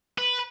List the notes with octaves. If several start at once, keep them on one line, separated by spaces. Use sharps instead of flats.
B4